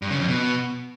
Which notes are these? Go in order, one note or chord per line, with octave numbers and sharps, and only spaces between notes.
G2
C#3
F2
B2